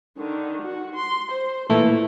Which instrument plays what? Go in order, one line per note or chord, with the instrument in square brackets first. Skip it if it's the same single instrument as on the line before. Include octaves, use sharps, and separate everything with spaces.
[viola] D3 D#3
F#4
C6
C5
[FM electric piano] A#2 E3 A3 [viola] E4